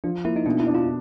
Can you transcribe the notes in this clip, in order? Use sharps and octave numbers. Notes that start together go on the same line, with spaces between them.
F3 D4
A#3 E4
D#4
B2 D4
E4
D4
F4